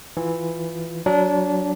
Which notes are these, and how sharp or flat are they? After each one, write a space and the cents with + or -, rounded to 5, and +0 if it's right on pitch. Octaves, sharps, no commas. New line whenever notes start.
E3 +0 F4 +0
F#3 +0 D4 -20